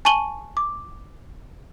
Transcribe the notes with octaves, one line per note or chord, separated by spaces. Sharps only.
G#5 A5 C#6 D#7 F#7 G7
D6